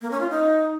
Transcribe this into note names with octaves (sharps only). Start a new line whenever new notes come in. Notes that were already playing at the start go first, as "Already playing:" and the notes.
A#3
C#4
F4
D#4